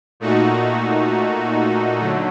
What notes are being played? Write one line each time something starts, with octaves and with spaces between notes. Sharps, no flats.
A#2 A3 D#4 F#4
D3 F#3 A3